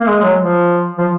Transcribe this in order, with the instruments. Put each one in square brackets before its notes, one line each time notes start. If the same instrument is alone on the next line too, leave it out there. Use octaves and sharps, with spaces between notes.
[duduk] A#3
G#3
F#3
F3
F3